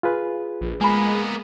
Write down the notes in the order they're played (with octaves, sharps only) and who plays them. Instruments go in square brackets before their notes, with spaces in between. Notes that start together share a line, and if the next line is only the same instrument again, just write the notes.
[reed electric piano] F4 G#4 B4
[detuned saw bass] A#1
[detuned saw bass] G#3 [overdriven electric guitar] A#3 B3 [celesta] G#5 B5